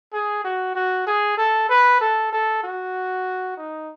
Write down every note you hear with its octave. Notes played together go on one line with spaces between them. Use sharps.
G#4
F#4
F#4
G#4
A4
B4
A4
A4
F#4
D#4